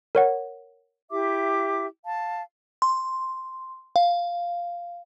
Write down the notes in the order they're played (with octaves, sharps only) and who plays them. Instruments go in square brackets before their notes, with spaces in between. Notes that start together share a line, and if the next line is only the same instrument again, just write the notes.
[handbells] A#4 C#5 F#5
[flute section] E4 G4 E5 D6
F5 A5
[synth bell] C6
F5